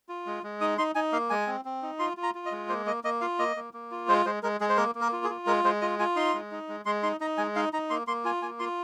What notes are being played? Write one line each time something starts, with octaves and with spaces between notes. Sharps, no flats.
F4
G#3
G#3
D#4 D#6
D#4 C6
D#4 G#5
A#3 F5
G#3 G#5
C4
C4
D#4
F4 C6
F4
A#5
F4
D#5
G#3
A#3 C5
A#3 D#5
A#3 D#5
F4 F5
A#3 D#5
A#3
A#3
F4
G#3 C5
G#3 C5
G#3 A#4
G#3 G#4
C5
A#3 A#4
A#3
A#4
F4
G#4
F4
G#3 A#4
G#3 C5
F4 D#5
F4 G#5
D#4 C6
G#3
D#4
G#3
G#3 C6
D#4 C6
D#4 A#5
G#3 G#5
D#4 F5
D#4 A#5
A#3 C6
A#3 C6
F4 G#5
A#3 G#5
F4 C6